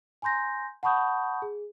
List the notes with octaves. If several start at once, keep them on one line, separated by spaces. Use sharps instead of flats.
G#5 A#5 C6 G6 A#6
F#5 A5 B5 C#6 D#6 G6
G#4